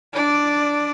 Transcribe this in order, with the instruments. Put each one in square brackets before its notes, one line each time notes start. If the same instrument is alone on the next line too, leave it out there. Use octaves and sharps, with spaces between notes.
[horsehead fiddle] D4 D5